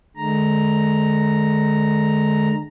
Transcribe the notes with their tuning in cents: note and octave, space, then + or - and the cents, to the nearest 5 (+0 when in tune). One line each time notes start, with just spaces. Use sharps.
D3 +40 G#3 +35 A#5 +0